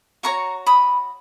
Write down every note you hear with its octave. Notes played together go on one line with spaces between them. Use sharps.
F#4 C#5 A#5 C#6
B5 D#6